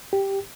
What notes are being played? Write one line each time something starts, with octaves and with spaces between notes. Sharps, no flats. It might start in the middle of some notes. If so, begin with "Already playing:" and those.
G4